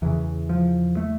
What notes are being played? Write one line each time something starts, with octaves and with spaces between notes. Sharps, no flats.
E2 C#3 E3
F3
A3